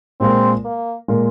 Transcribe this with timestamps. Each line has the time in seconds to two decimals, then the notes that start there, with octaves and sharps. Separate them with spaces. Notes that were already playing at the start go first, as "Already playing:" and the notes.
0.20 A#2 G#3 C4 F4 A#4
0.65 A#3
1.08 A#2 G#3 F4 A#4